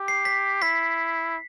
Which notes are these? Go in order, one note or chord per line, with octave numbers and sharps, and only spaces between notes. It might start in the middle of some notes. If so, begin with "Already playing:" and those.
Already playing: G4
C7
B6
E4 B6